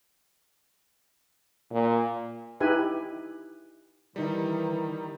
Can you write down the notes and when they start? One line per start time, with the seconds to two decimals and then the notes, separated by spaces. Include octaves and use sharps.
1.72 A#2
2.60 D#4 E4 G4 B4 G#5
4.16 D#3 E3 G3 D#4 E4